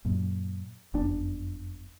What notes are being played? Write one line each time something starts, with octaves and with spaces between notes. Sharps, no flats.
F#2 A#2
F#1 F2 B3 D4